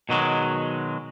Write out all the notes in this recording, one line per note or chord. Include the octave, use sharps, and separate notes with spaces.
B2 D#3 F#3 G#3